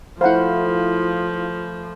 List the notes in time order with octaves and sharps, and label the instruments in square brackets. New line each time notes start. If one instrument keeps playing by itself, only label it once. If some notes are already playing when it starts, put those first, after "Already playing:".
[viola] F3 [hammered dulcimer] A3 B4 [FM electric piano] E4 F5 [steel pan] C5 F#5